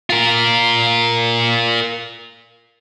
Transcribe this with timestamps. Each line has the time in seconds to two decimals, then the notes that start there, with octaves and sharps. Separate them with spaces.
0.10 F4 A#4